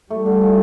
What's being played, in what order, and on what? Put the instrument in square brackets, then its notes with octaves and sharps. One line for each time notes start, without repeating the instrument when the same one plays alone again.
[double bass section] G3 [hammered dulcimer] A3
[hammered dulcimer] D3
F3